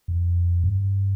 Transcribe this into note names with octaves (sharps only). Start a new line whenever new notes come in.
F2
G2